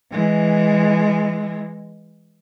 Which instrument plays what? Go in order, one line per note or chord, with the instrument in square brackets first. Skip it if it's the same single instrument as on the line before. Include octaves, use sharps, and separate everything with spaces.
[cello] E3 G#3